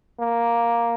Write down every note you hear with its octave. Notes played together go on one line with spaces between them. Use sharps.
A#3